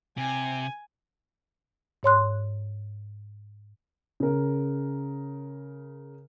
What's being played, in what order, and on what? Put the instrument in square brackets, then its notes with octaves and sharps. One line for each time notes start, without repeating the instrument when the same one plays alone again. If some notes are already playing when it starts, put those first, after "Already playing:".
[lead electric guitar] C3 [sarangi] G#5
[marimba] G#2 C#5 C6 F#6
[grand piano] C#3 A#4